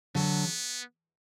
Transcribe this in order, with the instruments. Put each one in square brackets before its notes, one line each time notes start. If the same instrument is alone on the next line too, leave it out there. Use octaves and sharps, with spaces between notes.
[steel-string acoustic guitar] D3 F#3 [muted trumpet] B3